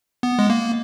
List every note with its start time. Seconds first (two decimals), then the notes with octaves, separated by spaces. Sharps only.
0.23 B3
0.39 G#3
0.50 A#3